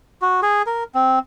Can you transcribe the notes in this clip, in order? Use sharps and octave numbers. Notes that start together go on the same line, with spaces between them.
F#4
G#4
A#4
C4